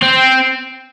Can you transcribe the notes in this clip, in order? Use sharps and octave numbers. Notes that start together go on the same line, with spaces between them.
C4